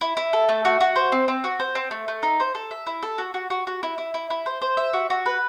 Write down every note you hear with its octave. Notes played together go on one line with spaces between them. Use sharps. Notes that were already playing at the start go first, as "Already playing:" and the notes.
E4
E4
A4
A3
F#4
F#4
C5
C4
C4
F#4
C5
C4
A3
A3
D#4
C5
A4
E5
E4
A4
F#4
F#4
F#4
F#4
E4
E4
E4
E4
C5
C5
E5
F#4
F#4
B4